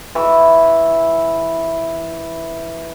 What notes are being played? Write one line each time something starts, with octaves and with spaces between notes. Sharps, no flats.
E3 E5 C#6